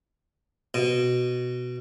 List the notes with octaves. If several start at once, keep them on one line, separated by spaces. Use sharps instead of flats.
B2